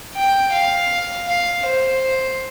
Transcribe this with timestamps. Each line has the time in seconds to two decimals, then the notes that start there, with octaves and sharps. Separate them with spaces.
0.15 G5
0.53 F5
1.28 F5
1.66 C5